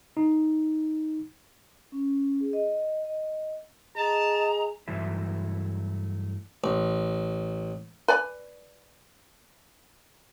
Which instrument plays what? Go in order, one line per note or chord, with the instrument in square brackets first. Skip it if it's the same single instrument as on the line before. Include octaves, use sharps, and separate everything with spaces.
[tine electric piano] D#4
[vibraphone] C#4
G#4
D#5
D#5
[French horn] G#4 [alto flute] D#5 [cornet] A5 [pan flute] A#5
[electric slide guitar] G2 E3 F#3 A3 E4 E5
[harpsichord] A1
[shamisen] B4 D5 G#5